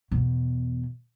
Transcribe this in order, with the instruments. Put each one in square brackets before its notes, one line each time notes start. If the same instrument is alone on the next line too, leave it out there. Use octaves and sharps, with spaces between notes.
[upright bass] E2 B2